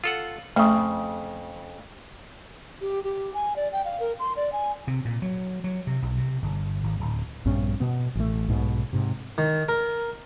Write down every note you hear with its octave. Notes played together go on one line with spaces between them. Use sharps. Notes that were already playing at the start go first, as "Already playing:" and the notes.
F4 A4 F#5
F2 C#3 A3
G4
G4
G#5
D5
G5
F5
A#4
C6
D5
G#5
C3
A#2
F#3
F#3
C3
B1
C3
G1
G#1
D1
A#1 G2 B3 C#4
B2 B3
A1 A3
B1 G#2 B2
G#2 C3
D#3
A#4